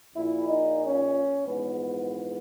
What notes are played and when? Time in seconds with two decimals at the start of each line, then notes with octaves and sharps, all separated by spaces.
0.15 A#1 A#2 E4
0.47 D#4
0.81 C#4
1.45 A#1 G#2 E3 B3
2.10 B3